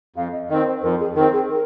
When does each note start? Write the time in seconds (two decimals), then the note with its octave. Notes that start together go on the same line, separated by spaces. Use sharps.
0.16 F2 F5
0.32 D#5
0.50 D#3 C4 D#5
0.67 C5
0.83 F2 A#4
1.00 G#4
1.16 D#3 A#4
1.20 C4
1.33 G#4
1.50 A#4